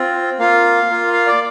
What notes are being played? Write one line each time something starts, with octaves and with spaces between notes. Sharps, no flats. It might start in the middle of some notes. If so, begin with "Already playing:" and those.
Already playing: C4 F4
A#3 F4 F5
A#3 F4
F5
D5